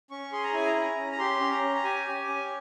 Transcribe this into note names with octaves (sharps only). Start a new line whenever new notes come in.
C#4 C#6
G#4 C6
A#5
E4 G#5
A#5
C#4
C#4
A#5
G4 C6
C#4
A#5
C#4
A#5
G4 G#5
G4
C#4